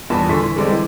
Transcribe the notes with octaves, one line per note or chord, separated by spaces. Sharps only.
E2 G2 A#2 A5 B5
D3 C6 C#6 B6
E3
D3 G3 G#3 C4 D4
E3